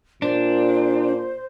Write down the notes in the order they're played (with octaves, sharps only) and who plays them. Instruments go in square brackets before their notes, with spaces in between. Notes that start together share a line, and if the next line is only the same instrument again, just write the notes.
[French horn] A#2 [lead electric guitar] D4 [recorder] C5